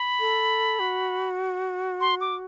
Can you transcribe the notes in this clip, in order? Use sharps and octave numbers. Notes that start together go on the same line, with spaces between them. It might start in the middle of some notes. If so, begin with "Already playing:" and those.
Already playing: B5
A4
F#4
C6
D6